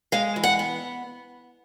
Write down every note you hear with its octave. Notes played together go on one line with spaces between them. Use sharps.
G#3 F5
E3
F#5
B3